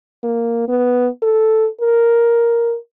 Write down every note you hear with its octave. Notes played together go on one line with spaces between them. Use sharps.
A#3
B3
A4
A#4